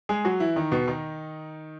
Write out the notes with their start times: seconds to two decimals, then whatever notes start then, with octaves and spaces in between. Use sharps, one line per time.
0.09 G#3 G#4
0.25 F#3 F#4
0.40 E3 E4
0.56 D#3 D#4
0.71 B2 B3
0.88 D#3 D#4